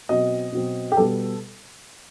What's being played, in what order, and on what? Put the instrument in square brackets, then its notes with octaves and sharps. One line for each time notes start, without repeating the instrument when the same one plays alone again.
[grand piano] B2 F#3 C4 D#5
B2 F#3 C4
G4
B2 G3 B3 A4